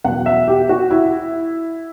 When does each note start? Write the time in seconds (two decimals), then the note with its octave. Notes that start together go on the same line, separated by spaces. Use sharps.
0.04 E2 B2 F#3 F#5
0.26 E5
0.48 G4
0.69 F#4
0.91 E4